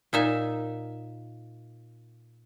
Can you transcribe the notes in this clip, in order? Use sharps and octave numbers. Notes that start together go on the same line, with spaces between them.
A#2 D#4 E5